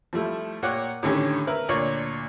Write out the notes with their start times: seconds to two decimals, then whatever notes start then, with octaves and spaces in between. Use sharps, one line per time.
0.13 F3 G3 A3 E4
0.62 A#2 A#3 C#5 F#5 G5 D6
1.03 A2 D3 D#3 C#4 G4
1.47 A#4 B4 E5
1.69 D2 A#2 C#5 D5 C#6